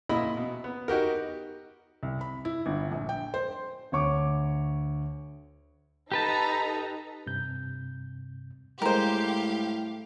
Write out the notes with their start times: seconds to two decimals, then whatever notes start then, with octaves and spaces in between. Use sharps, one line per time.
0.09 A#2 E4 D#5 B5
0.37 B2
0.64 B3
0.88 D#4 F#4 G4 A#4
2.03 C2
2.21 B5
2.45 E4
2.66 G1
2.92 A#1
3.09 G5
3.34 C5
3.92 D2 C#5 C#6 D6
6.12 D#4 G4 A4 B4 A5 A#5
7.27 G2 C3 G6
8.82 A2 G3 G#3 G4 A#4 C5 F5